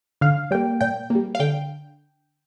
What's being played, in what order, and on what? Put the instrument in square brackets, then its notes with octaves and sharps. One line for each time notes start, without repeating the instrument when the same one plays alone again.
[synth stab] D3 F5
G3 A#3 G5
A#2 G5
G3 A#3
F5
D3 G5